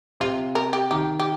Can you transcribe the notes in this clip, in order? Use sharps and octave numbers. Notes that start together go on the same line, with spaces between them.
C3 F4
A#4
G4
D#3 G4
G4